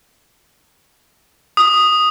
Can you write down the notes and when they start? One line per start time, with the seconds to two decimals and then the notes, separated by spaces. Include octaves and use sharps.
1.57 D#6